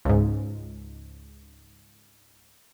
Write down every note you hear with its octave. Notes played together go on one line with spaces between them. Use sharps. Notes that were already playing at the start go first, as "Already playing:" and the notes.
C#2 G#2